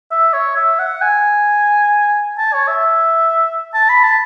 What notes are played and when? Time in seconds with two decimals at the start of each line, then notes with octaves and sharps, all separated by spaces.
0.11 E5
0.33 C#5
0.56 E5
0.79 F#5
1.02 G#5
2.38 A5
2.53 C#5
2.68 E5
3.74 A5
3.89 B5
4.03 A5